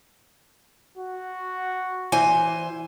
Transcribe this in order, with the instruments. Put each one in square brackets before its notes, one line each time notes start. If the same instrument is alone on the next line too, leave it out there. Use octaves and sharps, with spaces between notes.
[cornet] F#4
[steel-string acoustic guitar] E3 C5 G#5